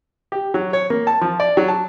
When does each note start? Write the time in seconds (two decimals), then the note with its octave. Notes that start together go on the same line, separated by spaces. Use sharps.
0.32 G4
0.54 F#3
0.73 C#5
0.90 A#3
1.07 A5
1.21 F3
1.40 D5
1.57 F#3
1.68 A5